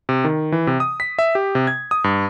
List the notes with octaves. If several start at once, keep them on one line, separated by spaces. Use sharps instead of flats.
C3
D#3
E3
C3
D#6
B6
E5
G4
C3
G#6
D#6
G2